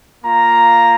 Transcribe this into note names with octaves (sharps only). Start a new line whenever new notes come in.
A#3 F4 A#5